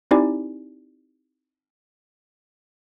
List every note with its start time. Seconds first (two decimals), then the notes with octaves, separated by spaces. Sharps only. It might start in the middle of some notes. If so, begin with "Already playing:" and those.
0.11 C4 D#4 E4 G4 D5 G#5